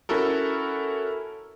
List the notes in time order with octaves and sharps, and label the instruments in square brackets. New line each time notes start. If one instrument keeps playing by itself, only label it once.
[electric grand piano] C#4 E4 F#4 A4 A#4